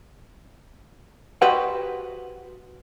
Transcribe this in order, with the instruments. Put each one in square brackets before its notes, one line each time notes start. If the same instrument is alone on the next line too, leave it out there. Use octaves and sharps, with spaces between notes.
[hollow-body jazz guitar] F#4 G4 B4 C5 D#5 F#5